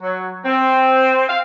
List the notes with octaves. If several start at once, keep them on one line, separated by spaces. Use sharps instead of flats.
F#3
C4
F5